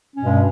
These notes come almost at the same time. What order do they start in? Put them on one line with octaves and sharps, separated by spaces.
C#4 B2 G2 G#3